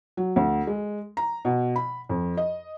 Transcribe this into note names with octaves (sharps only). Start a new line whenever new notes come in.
F#3
D2
G#3
A#5
B2
B5
F2
D#5